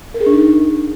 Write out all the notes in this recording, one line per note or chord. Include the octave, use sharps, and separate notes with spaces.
A#4
G#4
D4
D#4